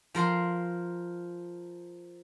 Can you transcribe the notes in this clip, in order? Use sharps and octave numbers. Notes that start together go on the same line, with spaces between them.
F3 A#4 C6